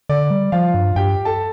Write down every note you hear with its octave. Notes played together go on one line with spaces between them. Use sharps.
D3 D5
G3
F3 F4 F5
G2
G2 G4 G5
A4 A5